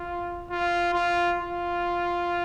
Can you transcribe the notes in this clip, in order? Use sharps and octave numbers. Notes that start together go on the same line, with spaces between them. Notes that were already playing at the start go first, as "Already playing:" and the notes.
Already playing: F4
F4
F4
F4